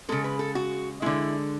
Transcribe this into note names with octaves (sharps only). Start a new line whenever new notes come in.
C#3 G#3 A4
B4
A4
F#4
D3 G#3 E4